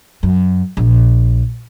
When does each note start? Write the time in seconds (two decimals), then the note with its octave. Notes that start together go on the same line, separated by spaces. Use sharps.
0.23 F#2
0.77 A#1